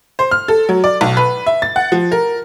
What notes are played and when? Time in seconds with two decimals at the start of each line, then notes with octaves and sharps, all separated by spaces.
0.19 C5
0.31 F6
0.48 A4
0.69 F#3
0.84 D5
1.01 B1
1.17 B4
1.46 E5
1.62 A6
1.76 F#5
1.92 F3
2.12 A#4